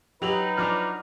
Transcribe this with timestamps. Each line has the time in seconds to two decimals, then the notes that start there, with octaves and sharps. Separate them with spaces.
0.22 F#3 D#4 G4 B4 E6 F7 F#7
0.57 F3 F#3 D4 D6 F6